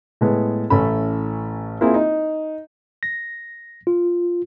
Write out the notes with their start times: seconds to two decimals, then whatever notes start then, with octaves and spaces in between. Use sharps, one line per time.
0.21 A2 G#3 B3
0.70 A1 A3 C#4 E4 B5
1.81 A#3 C4 E4 F4 G#4
1.94 D#4
3.03 A#6
3.87 F4